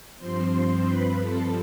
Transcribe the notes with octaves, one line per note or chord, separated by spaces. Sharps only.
G2 F3 C4 C5 C6
B4 B5
A4 A5